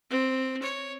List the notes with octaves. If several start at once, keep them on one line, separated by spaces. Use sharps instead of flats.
C4
C#5